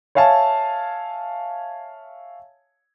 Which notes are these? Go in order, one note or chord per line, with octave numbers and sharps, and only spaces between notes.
C#5 E5 F5 G#5 A5